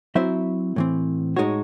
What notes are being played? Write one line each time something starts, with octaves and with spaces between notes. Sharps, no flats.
F#3 C4 E4 C5 E5
A2 E3 C4
A2 G#3 D#4 F#4 C#5